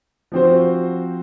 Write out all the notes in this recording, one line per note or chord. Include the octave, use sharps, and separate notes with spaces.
F3 C4 F#4 C5